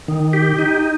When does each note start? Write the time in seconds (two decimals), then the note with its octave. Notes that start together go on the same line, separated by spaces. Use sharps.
0.08 D#3
0.33 G4
0.59 D#4